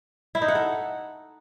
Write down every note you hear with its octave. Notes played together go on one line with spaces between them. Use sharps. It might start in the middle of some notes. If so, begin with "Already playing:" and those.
E4
D#4
F#5
A4